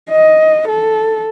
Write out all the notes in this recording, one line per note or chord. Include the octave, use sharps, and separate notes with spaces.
D#5
A4